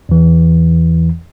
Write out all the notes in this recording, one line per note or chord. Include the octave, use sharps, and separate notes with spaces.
E2 E3